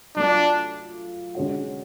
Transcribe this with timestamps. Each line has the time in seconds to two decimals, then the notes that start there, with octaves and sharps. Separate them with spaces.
0.16 F#3 A3 D4 F4
1.35 D3 G#3 C#4 F#4